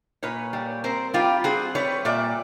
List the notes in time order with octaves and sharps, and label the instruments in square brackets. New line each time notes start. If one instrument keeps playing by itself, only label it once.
[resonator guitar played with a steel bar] A#2 B4 C#5
G3
C4 A#4 C5
G3 F4 G4
C4 F#4 G#4
G3 B4 C#5
A#2 D5 E5